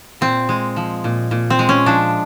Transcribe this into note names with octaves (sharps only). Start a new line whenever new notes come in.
A#2 C4
G#3
F3
A#2
A#2
C4
G#3
C#4
F3 D4